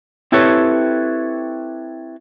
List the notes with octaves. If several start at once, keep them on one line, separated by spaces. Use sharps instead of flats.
C4 E4 G4 A4 B4 C#5